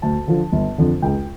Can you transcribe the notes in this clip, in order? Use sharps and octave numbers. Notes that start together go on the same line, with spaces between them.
D2 A5
D3 F3
G1
F2 D3
C#2 G5